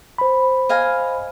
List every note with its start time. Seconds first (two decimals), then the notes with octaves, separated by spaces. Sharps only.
0.18 C5 B5
0.69 D#5 F5 G#5